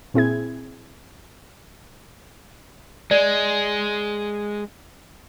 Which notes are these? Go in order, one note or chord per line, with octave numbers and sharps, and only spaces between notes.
A#2 C4 E4 G#4 G#6
G#3 D5